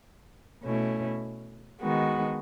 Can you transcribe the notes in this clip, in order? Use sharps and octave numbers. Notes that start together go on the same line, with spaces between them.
B2 A3 C#4 E4
D#3 G#3 B3 F#4